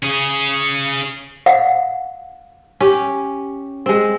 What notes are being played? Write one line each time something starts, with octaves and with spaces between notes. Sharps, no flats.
C#4 G#4
F5 F#5
C#4 G4
G#3 C4